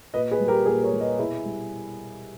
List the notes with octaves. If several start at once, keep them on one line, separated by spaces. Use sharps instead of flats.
A#2 B4 D#5
G#4 B4
G3
G4 A#4
A#2 G#4 B4
A#4 C#5
G3
B4 D#5
B2 E4 G#4
G3